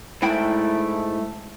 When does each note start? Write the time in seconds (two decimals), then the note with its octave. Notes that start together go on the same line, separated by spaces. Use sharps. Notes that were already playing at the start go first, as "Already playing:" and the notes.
0.22 G#2 A3 E4 G5 B5